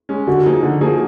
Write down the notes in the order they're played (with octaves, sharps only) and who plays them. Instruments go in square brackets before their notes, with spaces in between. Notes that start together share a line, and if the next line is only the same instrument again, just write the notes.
[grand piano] G#3 C#4
[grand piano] D3 [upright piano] F#4
[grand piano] F3 A#3 D#4 G#4
D3
F3 A#3 D#4 G#4